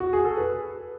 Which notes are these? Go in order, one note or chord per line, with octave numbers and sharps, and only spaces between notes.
F#4
G#4
A4
B4